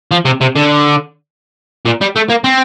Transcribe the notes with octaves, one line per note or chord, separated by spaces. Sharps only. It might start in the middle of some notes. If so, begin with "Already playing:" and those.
F3
C3
C3
D3
A#2
G3
A3
A#3
C4